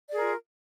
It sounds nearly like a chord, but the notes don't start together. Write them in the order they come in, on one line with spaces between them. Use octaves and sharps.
D5 G#4 A#4 F4